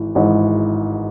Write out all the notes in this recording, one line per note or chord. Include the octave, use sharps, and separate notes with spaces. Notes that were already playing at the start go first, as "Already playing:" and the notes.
Already playing: G#1 E3
G#1 G#2 E3